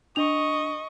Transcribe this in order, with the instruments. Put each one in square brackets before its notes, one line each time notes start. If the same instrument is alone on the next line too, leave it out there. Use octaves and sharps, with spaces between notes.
[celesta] D4 F7 [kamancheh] D#5 C#6